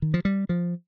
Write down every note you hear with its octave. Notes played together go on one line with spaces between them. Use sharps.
D#3
F3
G3
F3